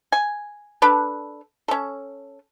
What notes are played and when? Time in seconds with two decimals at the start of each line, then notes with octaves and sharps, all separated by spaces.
0.12 G#5
0.82 D4 A4 B4
1.68 C#4 A4